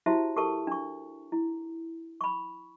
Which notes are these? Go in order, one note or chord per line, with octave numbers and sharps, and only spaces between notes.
E4 F#4 G4 C5 E5 A5
G4 A4 A#4 A5 C#6
D4 C#6
E4
B5 C#6